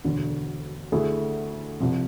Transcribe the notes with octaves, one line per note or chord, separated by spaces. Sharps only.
E1 D2 D3
D2 D3 A3 E4 G#4
C2 C3 F3